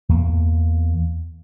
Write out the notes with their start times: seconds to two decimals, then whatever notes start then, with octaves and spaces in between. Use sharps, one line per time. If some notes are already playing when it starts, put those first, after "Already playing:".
0.09 E2 A#3